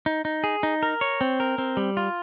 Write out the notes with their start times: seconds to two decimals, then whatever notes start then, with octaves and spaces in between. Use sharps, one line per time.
0.06 D#4
0.25 D#4
0.44 G#4
0.63 D#4
0.83 A#4
1.01 C#5
1.21 C4
1.40 A#4
1.58 C4
1.77 G3
1.97 F4